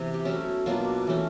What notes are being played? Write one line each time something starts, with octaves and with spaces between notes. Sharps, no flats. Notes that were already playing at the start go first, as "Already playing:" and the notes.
Already playing: C3 E3 B3
G4
F#3 A3 C#4 E4 F#4
B2 F#3 A#3 D4 F4
E3 A3 C#4